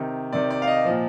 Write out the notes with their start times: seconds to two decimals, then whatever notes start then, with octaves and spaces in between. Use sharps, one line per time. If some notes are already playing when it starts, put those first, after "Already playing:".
Already playing: C3 D#3
0.32 C3 D#3 D5
0.50 D5
0.62 F5
0.67 D#5
0.85 A#2 F3